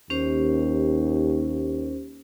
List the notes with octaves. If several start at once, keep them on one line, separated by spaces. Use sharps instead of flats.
D#2 C#4 G4 C5